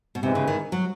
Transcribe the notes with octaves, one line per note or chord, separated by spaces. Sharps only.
B2
G#2 C3 E3 G#3
C#3
D#3
F#3